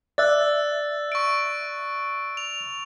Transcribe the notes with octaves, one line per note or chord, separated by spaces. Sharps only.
D5 E5 E6 F#6 A6
C#6 D7
F7